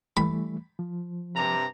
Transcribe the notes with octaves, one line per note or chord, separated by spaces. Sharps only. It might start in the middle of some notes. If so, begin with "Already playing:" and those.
E3 G3 A3 B5
F3
G2 C3 A#5